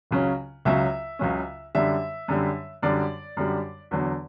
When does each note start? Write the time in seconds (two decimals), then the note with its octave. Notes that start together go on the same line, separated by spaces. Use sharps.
0.11 C#2 C#3 F#3 C#4
0.65 C#2 C#3 F#3 C#4 E5
1.19 C#2 C#3 F#3 C#4
1.75 F#2 D3 G3 E5
2.28 F#2 D3 G3
2.82 F#2 D3 G3 D5
3.37 F#2 D3 G3
3.91 E2 D3 F#3